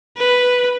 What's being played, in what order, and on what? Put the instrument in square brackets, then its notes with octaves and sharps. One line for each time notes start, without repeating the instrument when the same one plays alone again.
[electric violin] B4